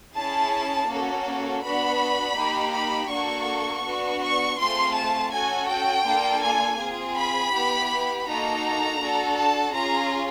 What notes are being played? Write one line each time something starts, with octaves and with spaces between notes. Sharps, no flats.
C#4 E4 G#4 A5
A#3 C#4 F#4 A4
B3 D4 F#4 B5
A#3 D#4 G4
B5
A#3 D4 F#4 A4 C#6
B3 D4 F#4
C#6
A3 C4 F4 G#4 C6
A5
C#4 F#4 A4 G#5
G5
A#3 D4 F4 A4
G#5
C4 F4 G#4
B5
B3 E4 G4
A#3 D#4 F#4 A4 A#5
D4 F#4 A4
A5
C#4 F4 G#4 A#5